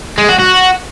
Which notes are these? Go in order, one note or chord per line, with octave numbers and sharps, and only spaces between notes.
G#3
F#4
F#4